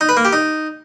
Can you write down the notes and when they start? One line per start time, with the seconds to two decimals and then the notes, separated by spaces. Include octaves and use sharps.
0.01 D#4
0.09 B4
0.17 A#3
0.25 G4
0.33 D#4